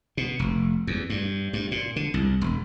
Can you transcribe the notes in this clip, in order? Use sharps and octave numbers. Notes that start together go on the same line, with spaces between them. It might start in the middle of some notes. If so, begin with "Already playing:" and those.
B2
F1
E2
G2
G2
A#2
D3
C2
E1